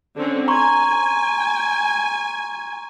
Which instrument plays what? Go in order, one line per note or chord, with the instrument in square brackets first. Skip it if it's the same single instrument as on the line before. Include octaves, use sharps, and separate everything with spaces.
[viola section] D3 C4 C#4
[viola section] G#5 [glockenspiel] A#5 C6 C#6